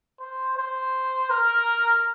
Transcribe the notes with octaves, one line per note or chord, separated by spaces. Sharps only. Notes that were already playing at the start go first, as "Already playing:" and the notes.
C5
C5
A#4